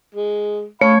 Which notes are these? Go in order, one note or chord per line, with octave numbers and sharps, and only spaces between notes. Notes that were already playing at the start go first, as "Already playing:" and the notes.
G#3
A3 C#5 F5 B5